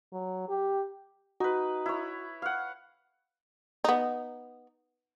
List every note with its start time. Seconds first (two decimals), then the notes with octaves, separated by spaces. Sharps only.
0.13 F#3
0.49 G4
1.40 D#4 F#4 B4
1.86 E4 C#5
2.42 F5 F#5
3.84 B3 D#4